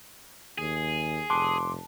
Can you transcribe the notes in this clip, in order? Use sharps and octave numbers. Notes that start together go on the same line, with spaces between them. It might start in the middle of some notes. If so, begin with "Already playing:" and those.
D#2 G#4
F1 A5 C6 D6